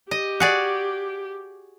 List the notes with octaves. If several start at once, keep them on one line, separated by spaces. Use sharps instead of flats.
G4 D#5
F#4 G#4 D5